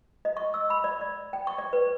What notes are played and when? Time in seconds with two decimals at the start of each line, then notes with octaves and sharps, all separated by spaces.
0.25 D#5
0.37 C#6
0.54 E6
0.70 B5
0.84 D5
1.01 D5
1.33 G5
1.47 C#6
1.58 D5
1.73 B4